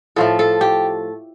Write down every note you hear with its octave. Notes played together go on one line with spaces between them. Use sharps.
A2 F3 A3 A4
A4
G4